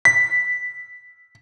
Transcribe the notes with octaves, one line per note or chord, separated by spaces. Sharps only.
B6